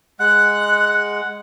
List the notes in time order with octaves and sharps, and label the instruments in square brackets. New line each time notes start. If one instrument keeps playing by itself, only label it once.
[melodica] G#3 F#5 [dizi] F#6